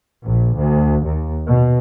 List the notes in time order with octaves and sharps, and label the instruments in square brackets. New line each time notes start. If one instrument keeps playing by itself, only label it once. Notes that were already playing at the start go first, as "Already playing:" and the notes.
[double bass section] A#1
D2
D#2
B2